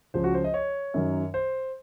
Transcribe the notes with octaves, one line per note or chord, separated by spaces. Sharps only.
C#2 C#3 F3 C5
F#4
C5
D#5
C#5
F#2 D#3 F#3
C5